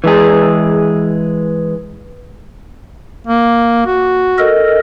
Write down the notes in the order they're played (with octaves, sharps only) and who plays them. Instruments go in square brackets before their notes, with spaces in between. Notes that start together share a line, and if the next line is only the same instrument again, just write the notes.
[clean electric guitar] E3 G#3 G#4
[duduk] A#3
F#4
[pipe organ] A4 A#4 D#5